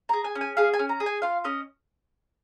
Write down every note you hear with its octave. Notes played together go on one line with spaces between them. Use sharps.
G#4 A#5
G#5
C#4
G#5
G#4 F5
G#5
C#4
A#5
G#4
G#5
F4 F5
C#4 D#5